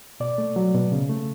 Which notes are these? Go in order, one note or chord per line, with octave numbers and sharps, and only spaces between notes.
B2 D5
A3
F#3
B2
C#3
A3